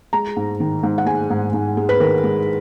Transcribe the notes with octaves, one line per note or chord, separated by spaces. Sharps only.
G#3 A#5
G#2
D#3
G#2
F#5
G#3 G#5
G#2
G#2
G#3
B4
D#3 A#4
G#3